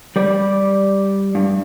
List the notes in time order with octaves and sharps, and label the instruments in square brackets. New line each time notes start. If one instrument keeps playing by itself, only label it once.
[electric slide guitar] G3 D5
G2